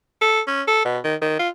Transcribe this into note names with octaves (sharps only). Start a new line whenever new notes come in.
A4
C#4
A4
B2
D#3
D#3
F4